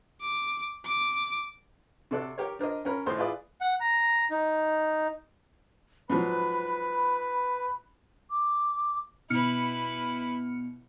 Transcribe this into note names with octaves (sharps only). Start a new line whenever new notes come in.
D6
D6
C3 F#4 A4 D5 F#6
G4 A#4 C#5
D4 A#4 C5 D#5
C#4 A#4 B5
G#1 A2 C5 C6
E4 F4 G#4 B4 D5 D#6
F#5
A#5
D#4
G#2 F3 F#3 B4 B5
D6
B2 E4 B4 F6 C#7